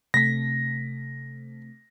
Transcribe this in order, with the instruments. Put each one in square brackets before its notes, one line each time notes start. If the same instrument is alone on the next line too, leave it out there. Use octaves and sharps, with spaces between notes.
[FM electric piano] C3 A3 [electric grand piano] A#6 B6